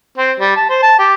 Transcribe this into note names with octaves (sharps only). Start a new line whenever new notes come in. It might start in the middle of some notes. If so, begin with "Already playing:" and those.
C4
G3
A5
C5
A5
G4